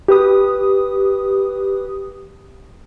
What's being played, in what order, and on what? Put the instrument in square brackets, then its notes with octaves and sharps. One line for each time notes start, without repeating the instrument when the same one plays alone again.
[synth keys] G4 B4 D#6